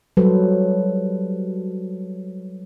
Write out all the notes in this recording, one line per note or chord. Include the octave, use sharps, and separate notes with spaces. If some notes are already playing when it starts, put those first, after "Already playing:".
F#3 G3 A4 B4 C5